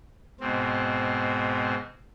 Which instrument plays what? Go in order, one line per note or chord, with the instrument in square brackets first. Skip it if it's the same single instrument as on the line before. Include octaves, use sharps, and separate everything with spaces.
[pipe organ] G#2 B2 C4